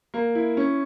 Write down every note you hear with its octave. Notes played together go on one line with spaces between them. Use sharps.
A#3
E4
C#4